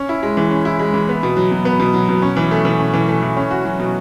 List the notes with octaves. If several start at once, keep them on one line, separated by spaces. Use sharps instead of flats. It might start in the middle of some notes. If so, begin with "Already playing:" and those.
Already playing: C#4
E4
G#3
E3
C#4
E4
G#3
E3
B3
B2
F#3
B2
B3
B2
F#3
B2
C#4
E3
A3
E3
C#4
E3
A3
E3
C#4
F#4
F#3
B2